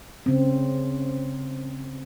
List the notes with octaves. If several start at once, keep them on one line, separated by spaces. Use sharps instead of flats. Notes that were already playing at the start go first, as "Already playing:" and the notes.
C#3 C4